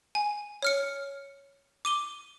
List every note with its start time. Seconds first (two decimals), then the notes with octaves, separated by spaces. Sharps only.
0.15 G#5
0.62 C#5 F6 C#7
1.85 D6 D#7 G7